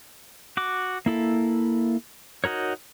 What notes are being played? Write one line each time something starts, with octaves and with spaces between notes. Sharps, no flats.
F#4 D6
A#3 E4 A4
D#4 F#4 A#4 C#5